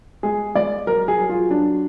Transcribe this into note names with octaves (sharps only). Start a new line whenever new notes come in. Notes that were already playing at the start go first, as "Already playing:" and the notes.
G#3 G#4
G#3 D5
F#3 A#4
G#4
F#3
F4
F#3 D4